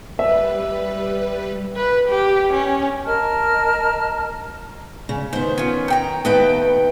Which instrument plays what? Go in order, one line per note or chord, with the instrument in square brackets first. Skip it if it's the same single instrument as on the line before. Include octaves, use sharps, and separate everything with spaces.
[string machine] G3 B4 [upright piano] E5
[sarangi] B4
G4
C#4
[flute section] A#4 D#5 A5 F6
[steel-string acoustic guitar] C#3
[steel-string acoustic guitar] D#3 B3 [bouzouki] C5
[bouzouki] C#4 F4
D#4 G5 A#5
[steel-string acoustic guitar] D#2 B4 G5 [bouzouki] A3 B3 D#5